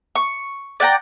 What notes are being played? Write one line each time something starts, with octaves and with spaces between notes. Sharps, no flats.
C#6
D5 F#5 G5 A#5